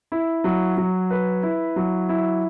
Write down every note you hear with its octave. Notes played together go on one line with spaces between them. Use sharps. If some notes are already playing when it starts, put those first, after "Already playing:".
E4
F#3
F#3
B4
E4
F#3
E4